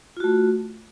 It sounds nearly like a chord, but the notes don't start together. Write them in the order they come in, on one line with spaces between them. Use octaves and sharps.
F4 F#4 A3